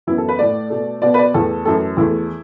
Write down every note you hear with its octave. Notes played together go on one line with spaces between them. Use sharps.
F#2 E3 B3 E4
A4
B4
A2 A3 D5
B2 A3
B2 B3 D5
B4
D5
E2 E3 A3 A4
F#2 E3 A3 A4
E2 E3 A3 E4